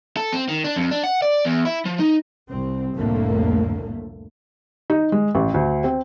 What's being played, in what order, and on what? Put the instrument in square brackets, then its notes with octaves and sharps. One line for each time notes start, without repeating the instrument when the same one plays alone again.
[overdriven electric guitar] A4
C4
D#3
D4
F2
D4
F#5
D5
E2
E4
F3
D#4
[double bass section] C2 C4
C2 F2 A2 D3 A3 A#3
[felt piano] D#4
G#3
A1
D2
C4